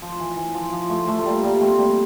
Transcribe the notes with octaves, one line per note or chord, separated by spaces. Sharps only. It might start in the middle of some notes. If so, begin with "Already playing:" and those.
F3
E3
E3
F3
F3
F3 A3
F3 A3
A3
G3 A#3
G3 A#3
A3 C4
G3 A#3